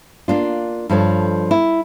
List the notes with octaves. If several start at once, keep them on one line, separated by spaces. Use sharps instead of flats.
A#3 D4 F4
G2 F3 A4 C#5
E4